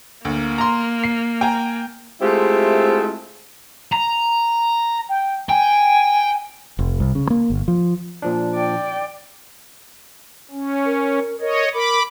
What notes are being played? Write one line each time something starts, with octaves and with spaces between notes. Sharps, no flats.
D2 A#3
A#5 C6
C7
G5 G#5 A#5
G#3 A3 C4 E4 F4 G4
A#5
G5
G5 G#5
F1
C2
C#3
A#3
G1
F3
A#2 F3 D4
D5 G5
C#4
A#4
A#4 C#5 D#5
A#4 B5 D6